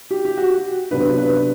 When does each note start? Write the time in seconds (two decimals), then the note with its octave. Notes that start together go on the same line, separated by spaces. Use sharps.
0.11 G4
0.25 G4
0.37 F#4
0.91 C3 F#3 B3 D4 B4
1.18 B4